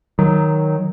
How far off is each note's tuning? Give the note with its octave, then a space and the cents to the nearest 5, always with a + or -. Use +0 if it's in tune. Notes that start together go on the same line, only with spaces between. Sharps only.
D#3 +0 F#3 +0